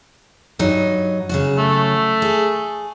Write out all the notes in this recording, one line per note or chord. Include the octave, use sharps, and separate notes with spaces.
G2 F#3 D#4
C#3 F#3 F#4
A3
G#4